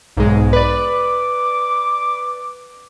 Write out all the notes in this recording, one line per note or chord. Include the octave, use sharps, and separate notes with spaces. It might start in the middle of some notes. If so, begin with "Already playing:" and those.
B1 G#2 G#3
B4 D5 D6